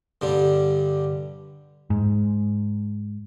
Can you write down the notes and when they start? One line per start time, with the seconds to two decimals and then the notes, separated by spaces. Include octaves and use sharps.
0.22 G2 D3 G3
1.90 G#2